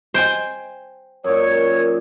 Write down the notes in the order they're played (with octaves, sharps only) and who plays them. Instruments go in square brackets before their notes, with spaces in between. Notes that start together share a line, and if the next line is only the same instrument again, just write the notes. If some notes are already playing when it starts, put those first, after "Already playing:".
[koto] C5 G5 G#5
[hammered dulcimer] F#2 A#2 [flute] C#5